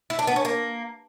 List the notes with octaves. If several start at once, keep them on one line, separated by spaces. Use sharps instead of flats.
E4
D4
B3
C#4
A#3